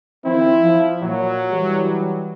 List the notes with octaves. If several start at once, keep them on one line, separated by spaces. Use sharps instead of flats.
D#3 F3 C4 E4
F3
A#2 F#3
E3 G3